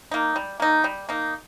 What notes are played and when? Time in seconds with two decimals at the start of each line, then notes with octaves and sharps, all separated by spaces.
0.11 A#3 D#4
0.36 G3
0.60 A#3 D#4
0.84 G3
1.09 A#3 D#4